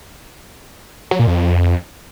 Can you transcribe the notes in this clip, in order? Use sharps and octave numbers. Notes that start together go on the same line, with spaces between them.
F#3
A#2
F2